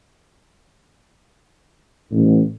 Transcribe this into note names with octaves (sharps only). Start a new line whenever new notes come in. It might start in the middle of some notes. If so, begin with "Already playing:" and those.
A1